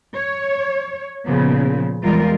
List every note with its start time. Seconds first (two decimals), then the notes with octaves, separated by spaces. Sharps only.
0.15 C#5
1.26 A#2 C#3 F3 B3
2.03 E2 G3 G#3 F4 A#4